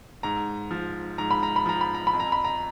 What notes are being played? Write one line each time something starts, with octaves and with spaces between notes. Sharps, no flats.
G#2 A#5
F3
G#2 A#5
B5
A#5
B5
F3 A#5
B5
A#5
B5
F2
A#5
B5
A#5